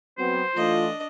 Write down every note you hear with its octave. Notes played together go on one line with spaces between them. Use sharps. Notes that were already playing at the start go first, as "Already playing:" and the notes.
F#3 B3 C4 C5
E3 A3 D4 F4 D#5